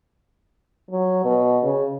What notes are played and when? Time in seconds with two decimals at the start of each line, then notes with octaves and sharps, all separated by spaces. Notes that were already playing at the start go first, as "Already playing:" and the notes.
0.91 F#3
1.24 B2
1.64 C#3